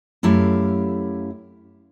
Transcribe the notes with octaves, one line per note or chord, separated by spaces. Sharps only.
F#2 A3 E4 G4 F5